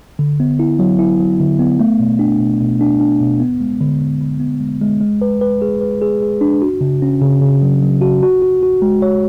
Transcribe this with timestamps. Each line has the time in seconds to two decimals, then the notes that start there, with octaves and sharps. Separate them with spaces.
0.19 D3
0.40 B3
0.59 E4
0.79 F#3
0.99 E4
1.19 F#3
1.40 D3
1.59 B3
1.80 A3
2.00 B2
2.19 D4
2.40 B2
2.60 B2
2.81 D4
3.00 D4
3.20 B2
3.40 B3
3.61 G#3
3.81 D3
4.01 B3
4.21 D3
4.40 B3
4.60 G#3
4.81 G#3
5.01 G#3
5.22 B4
5.41 B4
5.62 G#4
5.81 B4
6.02 G#4
6.22 G#4
6.41 D4
6.62 F#4
6.81 C#3
7.02 C#4
7.22 C#3
7.42 C#3
7.62 F#3
7.82 F#3
8.01 F#4
8.23 F#4
8.42 F#4
8.63 F#4
8.82 G#3
9.02 C#5